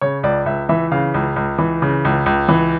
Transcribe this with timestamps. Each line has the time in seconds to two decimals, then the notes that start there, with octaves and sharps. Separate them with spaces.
0.01 C#3 C#5
0.23 C#2 D5
0.46 C#2 E5
0.69 E3 E5
0.92 C#3 F5
1.14 C#2
1.36 C#2
1.58 E3
1.82 C#3
2.05 C#2
2.26 C#2
2.49 E3